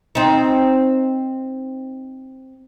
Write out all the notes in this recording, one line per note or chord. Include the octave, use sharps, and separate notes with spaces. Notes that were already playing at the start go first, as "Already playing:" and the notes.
C4 D#4